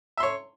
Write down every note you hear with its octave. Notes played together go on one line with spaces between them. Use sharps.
C#5 E5 C6